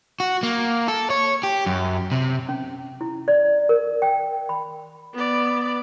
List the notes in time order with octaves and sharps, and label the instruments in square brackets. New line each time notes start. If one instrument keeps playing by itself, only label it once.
[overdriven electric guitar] F#4
A#3
A4
C#5
G4
F#2
C3
[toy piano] C#4
E4
D5
A#4
G5
B5
[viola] B3 D5